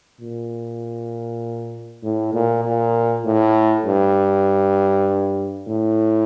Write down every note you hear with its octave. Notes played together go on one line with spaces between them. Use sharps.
A#2
A2
A#2
A#2
A2
G2
A2